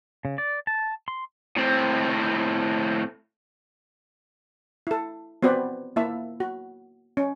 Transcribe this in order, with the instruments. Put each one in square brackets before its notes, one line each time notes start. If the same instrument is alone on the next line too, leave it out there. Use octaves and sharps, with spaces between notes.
[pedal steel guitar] C#3
D5
A5
C6
[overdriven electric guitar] A2 C4
[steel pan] E4 A4
B3 C4 F#4 B4 C5 D5
A#3 E4 E5 A5
F#4
C#4